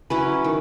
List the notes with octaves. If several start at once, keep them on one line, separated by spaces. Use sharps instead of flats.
F#3 C#4 E4 B4
D#3